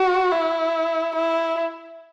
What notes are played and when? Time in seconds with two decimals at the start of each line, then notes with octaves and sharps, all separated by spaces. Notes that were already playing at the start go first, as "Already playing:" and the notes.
Already playing: F#4
0.32 E4
1.15 E4